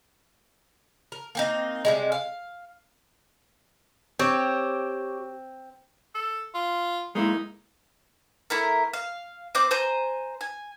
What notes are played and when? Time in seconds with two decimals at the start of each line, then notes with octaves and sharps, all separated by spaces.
1.12 A#4
1.35 A#3 C4 D#4
1.85 C3 G3 G#3
2.12 F5
4.19 C4 G4 C#5
6.14 A4
6.55 F4
7.15 G#3 A#3 D#4 E4
8.50 A3 E4 A#4
8.93 F5
9.55 C4 C5 D6
9.71 C5 G#5 A#5
10.41 G#5